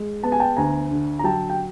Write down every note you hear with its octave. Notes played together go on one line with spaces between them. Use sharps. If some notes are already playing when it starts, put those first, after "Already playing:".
Already playing: G#3
B3 A5
G#5
G5 A5
D2 G#5 A#5
D3
A#5
F#3 G5 A5
G5